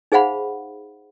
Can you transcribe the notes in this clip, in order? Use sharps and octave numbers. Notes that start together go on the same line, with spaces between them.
D#4 G#4 C5 F5 F#5 B5